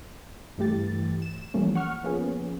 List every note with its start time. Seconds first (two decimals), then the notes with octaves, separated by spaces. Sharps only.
0.58 G2 E3 A3 G4 A6
1.22 E7
1.54 E3 F3 G3 A3 A#3 C#4
1.75 F#5 C#6 F6
2.04 F3 A#3 B3 C#4 G#4